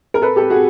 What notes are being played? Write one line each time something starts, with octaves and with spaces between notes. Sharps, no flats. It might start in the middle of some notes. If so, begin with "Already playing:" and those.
A#4
A4 B4
G4 A4
F#4 G#4